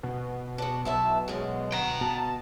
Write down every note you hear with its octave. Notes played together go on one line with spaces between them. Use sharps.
B2
D4 F#4
B1 E4 E5 A5
F#2 G#3
F#5 G5 A#5
B2 A5